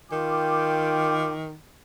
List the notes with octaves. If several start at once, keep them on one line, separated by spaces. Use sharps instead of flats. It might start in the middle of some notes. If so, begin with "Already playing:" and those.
D#3 F4 G5 D6